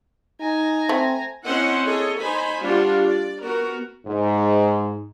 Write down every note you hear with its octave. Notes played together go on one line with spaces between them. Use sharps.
D#4 G#5 A#5
A3 C4
C4 C#4 E4 C5 D#5 F#5
G#4 A4 C#5 D#5
D#4 C5 G#5 B5
G3 D4 F4 F#4
D5
B3 F#4 A#4
G#2